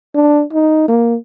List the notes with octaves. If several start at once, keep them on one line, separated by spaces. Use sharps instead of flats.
D4
D#4
A#3